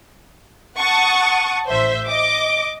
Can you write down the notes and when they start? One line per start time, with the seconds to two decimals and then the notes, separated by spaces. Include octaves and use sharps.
0.78 F#5 A5 C#6 D#6
1.69 A1 C5 E5
2.07 D#5 D6